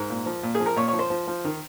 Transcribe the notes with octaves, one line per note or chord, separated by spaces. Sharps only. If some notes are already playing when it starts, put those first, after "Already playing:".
Already playing: G#2 A#4
A#2
F3
A#2
G#4
F3
A#4
A#2 C#5
F3 C#5
C5
F3
F3
D#3